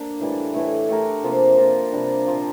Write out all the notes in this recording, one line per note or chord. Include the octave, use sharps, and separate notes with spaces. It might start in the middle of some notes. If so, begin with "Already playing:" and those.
Already playing: A#3 D4
A2 E3 G3
A2 E3 A3
A3 D4 G4 A#4
C3 F3 A#3
F3 A#3 F4 A#4
C3 G3 D4
A#2 F3 C4 F4